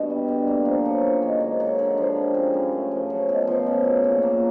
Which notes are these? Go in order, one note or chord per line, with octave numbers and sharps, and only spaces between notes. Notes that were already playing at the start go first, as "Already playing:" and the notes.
Already playing: G2 B2
G3
D3
A#3
F3
F#3
C#3
D#3
G#2
F#3
D3
F3
C3
C#3
F#2
A3
F3
F#3
B2
F3
C#3
F#3
A#2
A#3